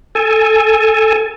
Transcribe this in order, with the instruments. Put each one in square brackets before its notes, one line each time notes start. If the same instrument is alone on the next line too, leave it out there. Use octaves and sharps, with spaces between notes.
[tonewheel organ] A4 G#5